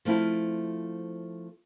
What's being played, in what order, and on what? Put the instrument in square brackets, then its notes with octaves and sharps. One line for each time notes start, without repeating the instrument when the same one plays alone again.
[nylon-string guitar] F3 A3 C4 E4 F4